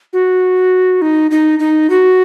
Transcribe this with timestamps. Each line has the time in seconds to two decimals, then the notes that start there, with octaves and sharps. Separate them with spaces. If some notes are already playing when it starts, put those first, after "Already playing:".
0.13 F#4
1.02 D#4
1.31 D#4
1.59 D#4
1.90 F#4